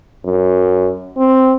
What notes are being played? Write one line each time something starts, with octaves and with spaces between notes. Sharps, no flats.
F#2
C4